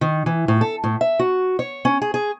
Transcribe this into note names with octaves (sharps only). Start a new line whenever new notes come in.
D#3
E3
A2
A4
A2
E5
F#4
C#5
C#4
G#4
G#4